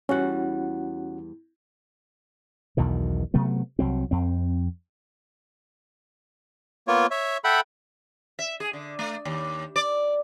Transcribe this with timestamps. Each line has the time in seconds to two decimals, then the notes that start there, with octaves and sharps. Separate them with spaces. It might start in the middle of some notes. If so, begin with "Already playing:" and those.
0.09 E2 G3 C#4 F#4 F#5
2.77 B1 E2 B2 D#3
3.34 C3 F#3 A3 B3
3.79 C2 F#3 C4
4.11 F2 C4
6.88 A#3 B3 F4 C#5
7.11 C#5 E5
7.44 A4 E5 F#5 G5 B5
8.39 E5
8.60 G#4
8.73 D3
8.99 A3
9.25 D#2
9.76 D5